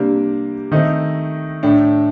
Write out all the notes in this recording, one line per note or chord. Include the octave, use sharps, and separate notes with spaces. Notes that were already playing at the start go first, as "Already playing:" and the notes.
Already playing: C3 G3 A#3 D4
D#3 A3 C4 D#5
A2 A3 D4